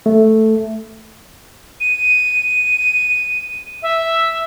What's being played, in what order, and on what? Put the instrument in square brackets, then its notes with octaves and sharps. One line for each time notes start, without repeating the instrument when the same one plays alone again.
[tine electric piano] A3
[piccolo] D#7
E5